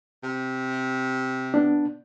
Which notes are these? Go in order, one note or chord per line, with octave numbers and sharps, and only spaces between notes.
C3
B3 D4